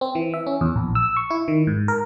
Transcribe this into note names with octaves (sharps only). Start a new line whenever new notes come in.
C4
E3
E5
C#4
E2
A#1
E6
C#6
E4
D#3
G#2
A#4